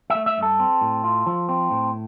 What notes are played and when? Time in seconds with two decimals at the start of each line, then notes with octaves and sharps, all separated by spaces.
0.10 E5
0.15 A3
0.26 E5
0.38 G2
0.43 A4
0.60 C4
0.81 A2
1.04 F4
1.27 F3
1.49 C4
1.71 A2